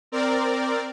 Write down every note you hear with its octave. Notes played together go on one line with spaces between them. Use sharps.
C4 A#4 D5